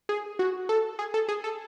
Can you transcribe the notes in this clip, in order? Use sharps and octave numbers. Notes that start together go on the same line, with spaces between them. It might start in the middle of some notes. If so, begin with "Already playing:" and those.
G#4
F#4
A4
G#4
A4
G#4
A4